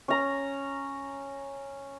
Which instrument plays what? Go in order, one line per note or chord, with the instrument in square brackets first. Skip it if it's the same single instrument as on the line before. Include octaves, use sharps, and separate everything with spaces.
[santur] C#4 A#5